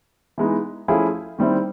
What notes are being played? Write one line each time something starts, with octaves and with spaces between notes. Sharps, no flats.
E3 G#3 B3 D#4
F3 A3 C#4 E4 G#4
D#3 G3 C4 E4